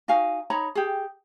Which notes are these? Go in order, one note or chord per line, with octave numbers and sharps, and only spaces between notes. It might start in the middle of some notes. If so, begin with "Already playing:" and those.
D#4 F#4 F5 G#5
D#4 C#5 A#5 B5
G4 G#4